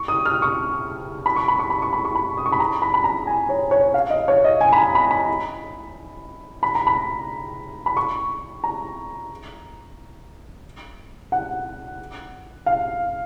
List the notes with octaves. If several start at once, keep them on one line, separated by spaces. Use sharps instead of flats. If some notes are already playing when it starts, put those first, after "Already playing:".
Already playing: C#6
D#6
F6
C#6
B5
C#6
B5
C#6
B5
C#6
B5
C#6
B5
D#6
C#6
B5
A#5
B5
B5
A#5
G#5
C#5
C#5
F5
D#5
C#5
D#5
G#5
B5
A#5
B5
B5
B5
A#5
B5
B5
C#6
A#5
F#5
F5